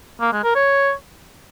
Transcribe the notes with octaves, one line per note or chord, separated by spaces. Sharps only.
A#3
G#3
A#4
C#5